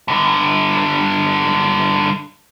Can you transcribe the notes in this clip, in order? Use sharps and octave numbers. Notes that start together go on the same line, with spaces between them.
G2 D3